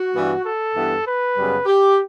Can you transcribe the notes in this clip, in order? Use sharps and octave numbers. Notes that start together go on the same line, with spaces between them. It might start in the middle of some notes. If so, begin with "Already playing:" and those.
Already playing: F#4
G2 E3 G3 B3
A4
G2 E3 B3
B4
F#2 C#3 G3 B3
G4